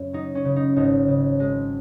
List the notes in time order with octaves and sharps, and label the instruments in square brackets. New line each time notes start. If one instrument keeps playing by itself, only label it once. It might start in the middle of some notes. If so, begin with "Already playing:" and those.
Already playing: [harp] F#2 C#3
F#3 D#4
C#4
C#3
D#4
G#1 D#4
C#3
G#3